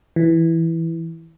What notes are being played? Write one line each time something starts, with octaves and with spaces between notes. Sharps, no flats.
E3